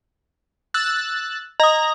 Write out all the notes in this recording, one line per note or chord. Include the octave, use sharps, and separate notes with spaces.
E6 F#6 A6
D#5 A#5 D#6